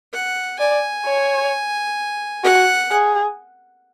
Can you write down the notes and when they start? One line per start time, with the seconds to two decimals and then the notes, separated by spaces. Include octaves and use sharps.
0.13 F#5
0.59 D5 G#5
1.05 C#5
2.44 F#4 F#5
2.91 G#4